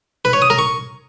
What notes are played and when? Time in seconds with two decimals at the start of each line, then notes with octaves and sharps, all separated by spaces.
0.25 B4
0.33 C#5
0.42 D#6
0.50 A#4
0.59 C#6